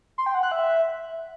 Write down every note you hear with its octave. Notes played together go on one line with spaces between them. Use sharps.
C6
G5
F#5
F#6
E5